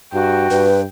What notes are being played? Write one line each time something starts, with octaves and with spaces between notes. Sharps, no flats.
G2 F#4 G5
G2 B4